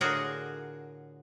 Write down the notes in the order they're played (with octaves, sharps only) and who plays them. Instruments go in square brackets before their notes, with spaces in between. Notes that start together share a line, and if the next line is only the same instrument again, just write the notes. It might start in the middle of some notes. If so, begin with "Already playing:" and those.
[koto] A2 D3 F4 F#4 G#4 A#4